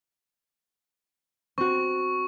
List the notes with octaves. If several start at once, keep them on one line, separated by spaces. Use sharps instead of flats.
C4 F#4 C#6